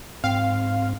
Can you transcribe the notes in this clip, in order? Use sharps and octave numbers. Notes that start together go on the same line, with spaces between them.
G#2 C4 F5